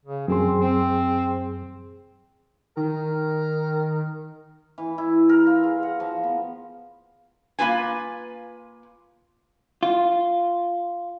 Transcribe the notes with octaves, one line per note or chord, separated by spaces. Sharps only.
C#3
F#2 C4 G#4 C6
C4
D#3 A#4
E3
E4
A#4
F4
G#4
F#5
F3
B3
A#3 F4 B4 G#5
F4